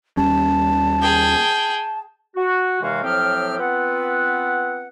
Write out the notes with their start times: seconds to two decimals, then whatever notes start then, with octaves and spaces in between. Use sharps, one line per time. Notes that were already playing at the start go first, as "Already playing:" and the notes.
0.17 D#2 G3 C#4 A5
1.02 G#4 G5
2.37 F#4
2.82 D#2 C3 E3 G#3 F#4 F5
3.03 A2 F3 F#3 C4 G4 F6
3.59 B3 C4 F4 B4 F#5